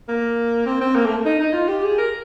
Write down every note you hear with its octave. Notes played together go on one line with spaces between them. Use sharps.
A#3
C4
C4
A#3
A3
D#4
D#4
F4
G4
G#4
A#4